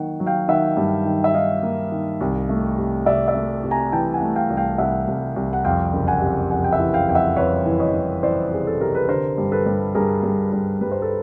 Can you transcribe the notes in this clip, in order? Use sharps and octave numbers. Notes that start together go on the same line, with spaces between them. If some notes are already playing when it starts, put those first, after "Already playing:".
Already playing: D#3 F#3 A#3 F#5
F#3
F5 G5
D#3 E5 F#5
G2
D#3
E5
D#3 D#5 F5
A#3
D#3
C2
A3
C3
C3 D5 E5
D5 E5
A3
C3
G#5 A#5
E3 G5 A5
F#5 G#5
A3
F5 G5
C2
F5 G5
C2 E5 F#5
C2
C2
F#5
F2 F5 G5
F#1
F#5 G#5
C3
F2 F#5 G#5
G5
E5 F#5
E3
F5 G5
F2 G5
E5 F#5
F2 B4 C#5
E3
C#5 D#5
E3
E3 C5 D5
C3 G#4
A4
C3 A#4
B4
D3 A#4 C5
G2
A4 B4
G2
G2 G#4 A#4
G2
G2
G2 B4
C5
A4 B4